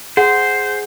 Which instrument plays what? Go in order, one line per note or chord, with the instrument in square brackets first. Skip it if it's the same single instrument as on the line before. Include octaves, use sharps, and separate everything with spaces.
[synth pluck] G#4 [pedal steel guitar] C5 [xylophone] F#5